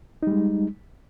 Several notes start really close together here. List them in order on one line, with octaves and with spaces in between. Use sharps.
D#4 G3 G#3